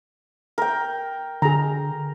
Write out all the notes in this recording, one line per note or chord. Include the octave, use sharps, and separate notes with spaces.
A#4 G5
D3 G#4 A#5